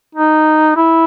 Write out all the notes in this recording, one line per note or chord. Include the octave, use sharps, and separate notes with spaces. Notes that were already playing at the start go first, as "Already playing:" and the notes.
D#4
E4